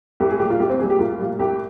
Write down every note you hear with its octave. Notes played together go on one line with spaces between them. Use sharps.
C2 G4
G#4
A#2 G3 G4
F4
C2 G4
C4
A#2 G3 G#4
G4
C2 F4
A#2 G3
C2 G4